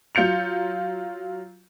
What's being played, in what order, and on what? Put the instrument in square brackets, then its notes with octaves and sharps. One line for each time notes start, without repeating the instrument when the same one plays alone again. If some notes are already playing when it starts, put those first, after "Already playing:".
[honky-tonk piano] F#3 F4 G6 C#7 F7